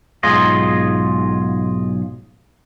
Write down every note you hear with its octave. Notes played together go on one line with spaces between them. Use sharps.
B1 G#2 F4 G#4 D#5